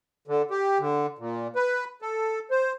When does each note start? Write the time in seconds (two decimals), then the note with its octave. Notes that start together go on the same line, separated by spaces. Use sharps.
0.28 D3
0.51 G4
0.79 D3
1.19 A#2
1.56 B4
2.02 A4
2.51 C5